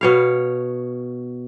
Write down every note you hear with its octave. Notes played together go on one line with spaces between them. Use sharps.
B2 C#5 F5